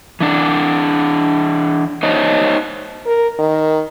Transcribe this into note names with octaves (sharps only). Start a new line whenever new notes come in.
E3 D4
D#4 C5 C#5 D#5
A#4
D#3